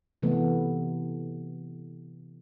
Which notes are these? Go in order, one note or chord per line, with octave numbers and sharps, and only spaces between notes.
C3 E3 A3 B3